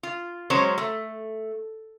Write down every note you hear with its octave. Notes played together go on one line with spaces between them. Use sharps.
F4
F#3 G#3 C#4 C5 C#5
A3